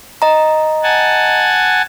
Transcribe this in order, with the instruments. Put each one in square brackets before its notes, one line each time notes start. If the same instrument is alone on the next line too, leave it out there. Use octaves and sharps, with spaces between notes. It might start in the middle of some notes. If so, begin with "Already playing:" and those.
[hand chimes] D#5 A#5
[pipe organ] F#5 G#5 A5